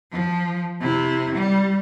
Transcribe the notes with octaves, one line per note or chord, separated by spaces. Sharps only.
F3
C3 E4
G3